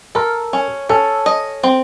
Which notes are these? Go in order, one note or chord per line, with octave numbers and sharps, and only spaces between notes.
A4 A#4
C#4
C#4 A4
D#5
C4